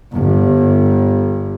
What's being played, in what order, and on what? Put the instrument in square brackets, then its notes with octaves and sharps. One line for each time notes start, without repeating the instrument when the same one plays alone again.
[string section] G1